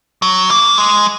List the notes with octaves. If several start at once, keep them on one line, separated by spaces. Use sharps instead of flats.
F#3
A#3
G#3